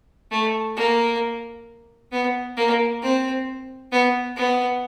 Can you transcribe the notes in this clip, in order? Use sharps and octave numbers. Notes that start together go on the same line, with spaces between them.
A3
A#3
B3
A#3
C4
B3
B3